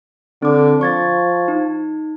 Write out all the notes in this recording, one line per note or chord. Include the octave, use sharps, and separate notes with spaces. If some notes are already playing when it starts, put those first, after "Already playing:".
D3 C4 D6
F3 C#6 G#6 A6
D#4